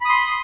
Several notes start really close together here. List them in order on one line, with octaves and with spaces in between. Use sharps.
B5 D#6 C6